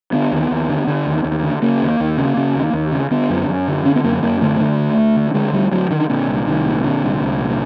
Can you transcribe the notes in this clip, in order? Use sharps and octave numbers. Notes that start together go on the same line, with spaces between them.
D3 B3
D#2
D#2
D3
D3
D#2
D#2
D3
C#3 A#3
D#2
D#2
C#3
C#3
D#2
D#2
C#3
D3 B3
F#2
F#2
D3
D3 C#4
B3
F#2 A#3
F#2 A#3
D3 A3
D3
D2
D2
D3
D3 G#3
D2 G3
D2 F#3
D3 D#3
A#2 D3
C2
C2 D#3
A#2
A#2 D3
C2
C2
A#2